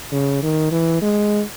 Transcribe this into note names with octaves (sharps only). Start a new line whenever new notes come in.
C#3
D#3
E3
G#3